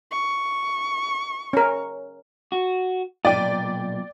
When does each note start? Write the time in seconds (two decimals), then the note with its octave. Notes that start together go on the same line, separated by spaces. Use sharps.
0.11 C#6
1.53 C#4 A#4
2.52 F#4
3.25 B1 A#2 D5 G5